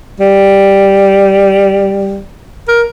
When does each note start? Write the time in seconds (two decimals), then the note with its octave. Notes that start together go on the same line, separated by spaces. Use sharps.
0.20 G3
2.68 A#4